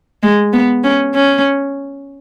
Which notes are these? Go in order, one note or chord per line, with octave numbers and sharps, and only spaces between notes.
G#3
B3
C#4
C#4